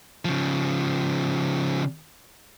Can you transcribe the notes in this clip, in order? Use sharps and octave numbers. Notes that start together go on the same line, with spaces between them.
C#3 F3